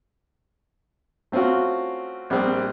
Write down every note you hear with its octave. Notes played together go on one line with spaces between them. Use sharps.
A3 C4 C#4 F4 F#4
A#1 G3 C4